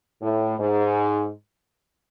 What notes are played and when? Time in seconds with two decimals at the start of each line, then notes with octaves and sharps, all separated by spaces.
0.21 A2
0.59 G#2